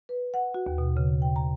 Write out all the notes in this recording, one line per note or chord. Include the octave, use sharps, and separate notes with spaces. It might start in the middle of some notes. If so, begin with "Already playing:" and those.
B4
F#5
F#4
D#2
B2
C#3
G5
A#5